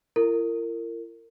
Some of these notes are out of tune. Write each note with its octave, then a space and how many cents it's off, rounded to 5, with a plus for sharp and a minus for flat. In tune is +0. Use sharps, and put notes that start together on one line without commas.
E4 +45 A#4 -30